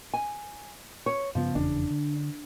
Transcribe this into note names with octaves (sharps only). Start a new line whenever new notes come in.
G#5
C#5
G2 C#3 F3 B3
F1 E2 C#3 D4
D3